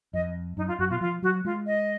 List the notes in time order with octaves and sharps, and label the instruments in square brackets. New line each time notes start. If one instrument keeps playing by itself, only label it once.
[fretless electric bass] F2 [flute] D#5
[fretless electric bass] F#2 [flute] D#4
[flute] F4
[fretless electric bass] F#2 [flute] F#4
[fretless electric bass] B2 [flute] F4
[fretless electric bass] F3 [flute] F4
[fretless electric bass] F#3 [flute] F#4
[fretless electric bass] G#3 [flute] F4
[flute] D#5